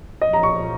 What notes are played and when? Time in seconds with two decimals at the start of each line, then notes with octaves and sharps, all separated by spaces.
0.21 A#1 A#2 F3 D#5
0.33 A#5
0.43 C#6